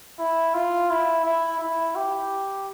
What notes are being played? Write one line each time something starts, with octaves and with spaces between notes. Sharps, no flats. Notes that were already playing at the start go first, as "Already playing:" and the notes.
E4
F4
E4
E4
E4
G4